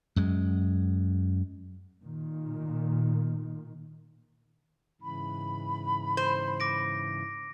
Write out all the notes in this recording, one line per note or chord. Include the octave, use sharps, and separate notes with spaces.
F#2 G#3
A#2 D#3
G#2 C#3 E3 B5
C5
D6 A#6 D7